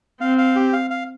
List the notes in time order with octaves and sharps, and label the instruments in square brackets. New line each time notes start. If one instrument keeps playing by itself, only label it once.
[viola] C4 [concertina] F5
[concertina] F5
G4
F5
F5